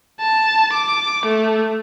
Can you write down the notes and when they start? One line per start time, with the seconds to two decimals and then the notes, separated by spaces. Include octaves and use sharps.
0.21 A5
0.73 D6
1.26 A3